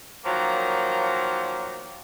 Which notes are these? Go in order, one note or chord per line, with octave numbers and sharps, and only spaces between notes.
D#3 F3 F#3 A#3